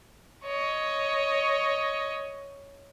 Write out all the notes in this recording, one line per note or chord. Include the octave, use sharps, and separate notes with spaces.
C#5 D#5